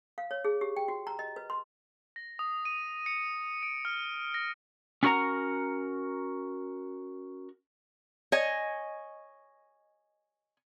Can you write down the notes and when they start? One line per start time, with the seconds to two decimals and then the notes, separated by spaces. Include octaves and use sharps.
0.18 F5
0.31 C#5
0.45 G#4
0.61 G4
0.77 G5
0.88 F#4
1.07 A#5
1.19 D#5
1.36 B4
1.50 C6
2.16 A#6
2.39 D#6
2.65 D#7
3.06 C#7
3.63 D7
3.85 F6
4.34 A#6
5.03 C#4 D4 F#4 A#4 F#5 A#5
8.32 C#5 D#5 G#5